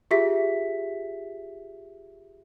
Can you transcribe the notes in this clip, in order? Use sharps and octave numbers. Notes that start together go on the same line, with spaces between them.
F4 G4 G#4 E5 B6